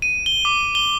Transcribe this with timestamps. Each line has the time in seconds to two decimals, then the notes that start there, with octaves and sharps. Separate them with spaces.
0.02 D#7
0.26 G7
0.45 D6
0.75 G7